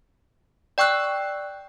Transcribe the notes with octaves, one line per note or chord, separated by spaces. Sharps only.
D5 G5 C#6 E6 F#6